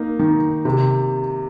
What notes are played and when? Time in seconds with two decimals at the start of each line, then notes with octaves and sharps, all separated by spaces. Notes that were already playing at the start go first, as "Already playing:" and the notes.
Already playing: A#3 D#4
0.19 D#3
0.65 C3